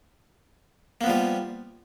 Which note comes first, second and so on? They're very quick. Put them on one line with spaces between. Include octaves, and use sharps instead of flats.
A#3 B3 F3 G3